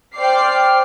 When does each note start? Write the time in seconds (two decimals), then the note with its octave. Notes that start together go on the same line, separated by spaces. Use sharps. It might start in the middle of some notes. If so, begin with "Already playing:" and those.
0.15 C5 D5 G5 D6 F6 C7